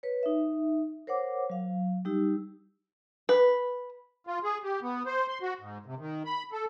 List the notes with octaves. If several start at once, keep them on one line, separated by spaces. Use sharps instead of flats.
B4 C#5
D#4 E5
A#4 C5 C#5 F#5 D6
F#3 F5
G3 D#4 G4 E6
B4
F4
G#4
G4
B3
C5
C6
F#4
G#2
C3
D#3
B5
A4